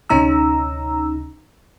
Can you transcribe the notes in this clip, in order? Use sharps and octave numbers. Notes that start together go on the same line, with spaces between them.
D2 C3 C#4 D#4 A#5 E6